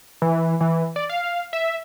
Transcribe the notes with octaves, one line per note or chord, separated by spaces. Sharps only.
E3
E3
D5
F5
E5